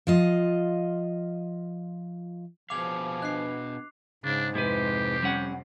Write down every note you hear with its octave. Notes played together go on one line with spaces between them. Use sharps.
F3 F4 D#5
B2 F3 G#4 F5 D6 F7
D4 B4 D#5 F#6 C7
G#2 C#3 D4
F2 C3 G#3 E4 G4 B4
G3 C#4 F#5